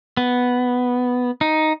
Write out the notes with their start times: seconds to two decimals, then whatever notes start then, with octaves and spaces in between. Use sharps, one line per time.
0.17 B3
1.41 D#4